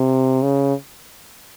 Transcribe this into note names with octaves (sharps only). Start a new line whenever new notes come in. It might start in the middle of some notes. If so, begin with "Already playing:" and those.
Already playing: C3
C#3